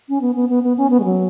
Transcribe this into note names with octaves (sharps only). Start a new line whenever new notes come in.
C#4
B3
B3
B3
B3
C#4
B3
G#3
F#3